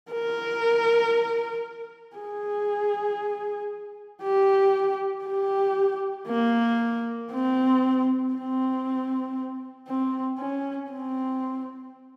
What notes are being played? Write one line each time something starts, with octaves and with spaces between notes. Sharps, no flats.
A#4
G#4
G4
G4
A#3
C4
C4
C4
C#4
C4